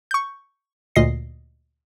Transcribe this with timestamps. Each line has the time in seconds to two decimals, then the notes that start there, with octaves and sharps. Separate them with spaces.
0.11 C#6 G6
0.96 D2 A#2 D#5 A#6 C7